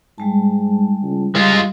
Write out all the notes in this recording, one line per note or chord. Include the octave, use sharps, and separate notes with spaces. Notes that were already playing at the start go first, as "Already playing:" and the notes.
G#2 G3 G#3 A5
C#2
G3 G#3 F4 D#5 F5